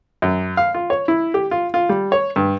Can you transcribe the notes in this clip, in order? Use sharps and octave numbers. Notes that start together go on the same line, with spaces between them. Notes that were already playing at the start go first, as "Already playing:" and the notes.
F#2
F5
F4
C#5
E4
G4
F4
F4
G3
C#5
G2